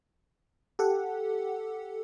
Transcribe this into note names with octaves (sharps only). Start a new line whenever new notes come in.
G4 A4 F#5